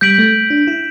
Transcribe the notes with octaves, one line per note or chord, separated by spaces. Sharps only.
G3 G6 B6 D7 F#7
A3
D4
E4